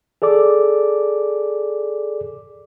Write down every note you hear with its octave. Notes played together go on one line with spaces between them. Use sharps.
G#4 A4 D5 D6